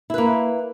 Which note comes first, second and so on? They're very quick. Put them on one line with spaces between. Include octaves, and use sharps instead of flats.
E4 B4 A#3